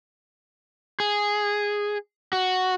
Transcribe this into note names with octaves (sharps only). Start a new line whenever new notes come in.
G#4
F#4